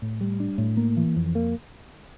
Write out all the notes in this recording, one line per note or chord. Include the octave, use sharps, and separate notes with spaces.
A2
G3
D4
A2
A#3
E3
F2
A#3